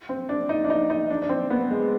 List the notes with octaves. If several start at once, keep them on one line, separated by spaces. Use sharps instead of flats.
C4
D4
D#4
D4
D#4
D#4
D4
D4
C4
B3
G#3